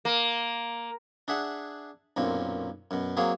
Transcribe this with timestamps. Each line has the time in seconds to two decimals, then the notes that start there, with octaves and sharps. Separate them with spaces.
0.05 A#3
1.28 D4 G#4 E5 F#5
2.17 B1 F#2 A#2 C4
2.91 F#2 B2
3.17 F#3 A#3 C4 G#4